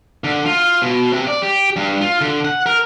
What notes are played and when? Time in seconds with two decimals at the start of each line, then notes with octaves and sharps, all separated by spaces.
0.24 D3
0.46 F4
0.82 B2
1.13 C3
1.27 D5
1.42 G4
1.76 G2
2.01 F4
2.21 D3
2.45 F#5
2.66 A#4